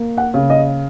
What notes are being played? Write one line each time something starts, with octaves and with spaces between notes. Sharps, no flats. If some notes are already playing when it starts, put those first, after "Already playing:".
Already playing: A#3
F#5
C#3
D#5